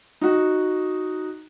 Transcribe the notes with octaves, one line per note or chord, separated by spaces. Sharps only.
D#4 F#4